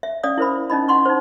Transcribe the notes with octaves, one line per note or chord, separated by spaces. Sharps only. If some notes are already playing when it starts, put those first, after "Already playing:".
E5
C#4 D5 F5 D#6
E4 A#4 C5 B5
C#4 D#4 D#5 B5
F#5 C6 C#6
D#4 C5